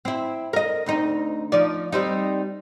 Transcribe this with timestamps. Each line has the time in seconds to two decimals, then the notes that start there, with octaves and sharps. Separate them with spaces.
0.05 C4 E4
0.53 A#4 D#5
0.86 D2 C4 D#4
1.52 F3 D#4 D5
1.92 G3 C4 D#4